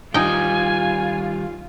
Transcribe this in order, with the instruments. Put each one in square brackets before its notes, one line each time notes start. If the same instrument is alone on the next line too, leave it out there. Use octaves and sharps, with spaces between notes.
[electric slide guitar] D#3 G3 [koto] D#4 G5 [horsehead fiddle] F4 [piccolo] G#5